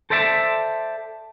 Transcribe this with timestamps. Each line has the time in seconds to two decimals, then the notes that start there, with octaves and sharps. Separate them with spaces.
0.10 A4 C5 D5 E5 F#5 A5